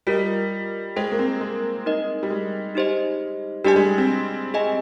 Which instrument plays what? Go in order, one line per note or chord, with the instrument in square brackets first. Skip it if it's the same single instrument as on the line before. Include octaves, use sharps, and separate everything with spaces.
[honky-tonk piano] G3 [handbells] F4 A#4 D#5
[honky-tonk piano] G#3 [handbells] G#4 C5 G5
[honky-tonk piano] A#3
C4
G#3
[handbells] D#4 A#4 D#5
[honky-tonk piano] G3
G#3
[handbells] D#4 G4 C5 D#5
[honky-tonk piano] G3 [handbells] D4 G4 D5 G#5
[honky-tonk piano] G#3
C4
[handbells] G#4 D#5 G#5